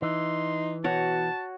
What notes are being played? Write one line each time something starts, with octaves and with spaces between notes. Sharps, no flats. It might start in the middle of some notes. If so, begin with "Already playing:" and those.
E3 D#4 C6
B2 F#4 C#5 A5